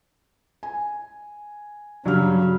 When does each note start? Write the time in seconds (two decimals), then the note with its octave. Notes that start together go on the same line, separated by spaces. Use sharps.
0.63 G#5
2.05 G2 C#3 F#3 G4 F6